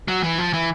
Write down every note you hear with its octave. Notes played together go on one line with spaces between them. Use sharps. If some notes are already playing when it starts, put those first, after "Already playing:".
F#3
E3
F3
E3